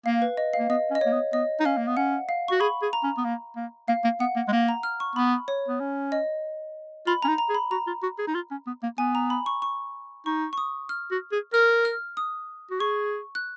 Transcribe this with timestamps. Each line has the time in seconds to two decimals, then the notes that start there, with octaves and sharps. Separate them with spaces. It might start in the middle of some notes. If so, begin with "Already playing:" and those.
0.06 A#3 F5
0.22 B4
0.37 D#5
0.53 F5
0.59 A#3
0.69 B3 D#5
0.91 C#4
0.95 D#5
1.01 A#3 C#5
1.12 B3
1.33 B3 D#5
1.60 D#4
1.65 C#4 F5
1.77 A#3
1.87 B3
1.97 C#4 F#5
2.29 F5
2.48 F#4 C#6
2.61 G#4 B5
2.82 G#4
2.93 A#5
3.03 C#4
3.17 B3
3.24 A#3
3.56 A#3
3.88 A#3 F5
4.04 A#3
4.20 B3 F#5
4.36 A#3
4.48 G#3
4.52 A#3
4.69 A#5
4.83 F6
5.00 C#6
5.16 B3 B5
5.48 C#5
5.68 B3
5.80 C#4
6.12 D#5
7.07 F4 B5
7.22 C#4 A#5
7.28 D#4
7.38 A#5
7.49 G#4
7.54 B5
7.71 F#4 A#5
7.87 F4
8.03 F#4
8.19 G#4
8.27 D#4
8.35 F4
8.51 C#4
8.67 B3
8.83 A#3
8.98 B3 G#5
9.15 A#5
9.30 B5
9.46 C#6
9.62 C#6
10.26 D#4 C#6
10.53 C#6
10.58 D#6
10.89 F6
11.11 F#4
11.32 G#4
11.53 A#4 F6
11.85 F6
12.17 D#6
12.71 F#4
12.80 G#4 C#6
13.35 F#6